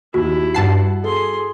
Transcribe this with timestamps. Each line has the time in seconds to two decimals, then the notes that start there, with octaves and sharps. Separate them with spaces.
0.14 D#2 E4 F#4
0.54 G2 F#5 A5 C7
1.04 G#4 A4 C6